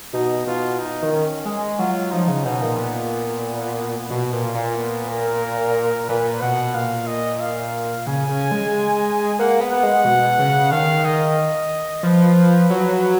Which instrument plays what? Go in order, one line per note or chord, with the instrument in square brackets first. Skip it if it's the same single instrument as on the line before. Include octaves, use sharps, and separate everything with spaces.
[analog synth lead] B2 [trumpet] D#4
[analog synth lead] B2 [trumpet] F4
[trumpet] D#4
[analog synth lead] D#3
[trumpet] C#4
[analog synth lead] G#3
[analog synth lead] F#3 [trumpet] F4
[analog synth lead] F3 [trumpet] D#4
[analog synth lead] C#3
[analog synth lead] B2 [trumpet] D#4
[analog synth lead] A#2
[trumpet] B3
[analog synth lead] B2
A#2
[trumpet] F4
[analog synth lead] A#2
[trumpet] B3
A#4
[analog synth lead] A#2 [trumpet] B4
[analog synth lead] B2 [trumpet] F#5
[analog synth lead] A#2 [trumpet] F5
[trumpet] D#5
F5
[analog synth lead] C#3 [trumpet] G#5
[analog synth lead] C#3
G#3
[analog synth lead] A#3 [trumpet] F#5
[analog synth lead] B3
[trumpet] F#5
[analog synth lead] G#3
B2
C#3
[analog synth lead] D#3 [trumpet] F5
[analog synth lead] D#3 [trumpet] D#5
[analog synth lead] F3 [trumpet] B4
[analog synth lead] F#3